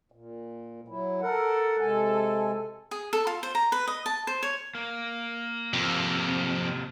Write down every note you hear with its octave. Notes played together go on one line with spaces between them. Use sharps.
A#2
F#3 E4
A4 A#4 F#5
C3 G#3 G#5
G#4
A4
F4
C5
A#5
B4
D#5
A5
C5
C#5
A#3
F2 C3 A#3